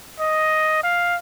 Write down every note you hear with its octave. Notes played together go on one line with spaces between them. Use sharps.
D#5
F5